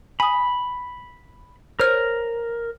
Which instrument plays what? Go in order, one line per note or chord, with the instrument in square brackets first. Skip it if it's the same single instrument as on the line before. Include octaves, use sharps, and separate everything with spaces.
[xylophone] G#5 D#6 [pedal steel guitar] B5
[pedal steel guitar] A#4 [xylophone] C5 C#5 F6